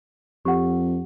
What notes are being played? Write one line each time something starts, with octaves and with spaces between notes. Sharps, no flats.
F2 G4 F#5